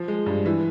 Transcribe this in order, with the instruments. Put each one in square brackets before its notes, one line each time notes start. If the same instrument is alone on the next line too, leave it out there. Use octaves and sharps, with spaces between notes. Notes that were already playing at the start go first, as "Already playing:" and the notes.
Already playing: [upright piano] F3
G#3
G2
E3